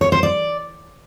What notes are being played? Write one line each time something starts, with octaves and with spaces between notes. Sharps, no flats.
C#5
C5
D5